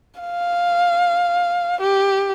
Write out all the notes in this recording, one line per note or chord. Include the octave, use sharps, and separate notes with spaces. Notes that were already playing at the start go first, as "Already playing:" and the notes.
F5
G4